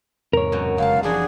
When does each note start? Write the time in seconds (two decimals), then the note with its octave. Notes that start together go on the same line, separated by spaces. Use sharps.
0.33 E2 G#2 C3 A#4 C#5
0.52 F#2 B2
0.78 F1 F#2 C#3 G#3 F5 A5
1.03 F#1 E3 F3 G3 D4 F#4 G#4